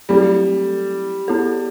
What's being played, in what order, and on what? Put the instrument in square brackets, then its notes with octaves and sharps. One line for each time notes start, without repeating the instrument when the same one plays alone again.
[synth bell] F#3 A3 C4 E4 A4 [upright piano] G3
[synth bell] B3 E4 A4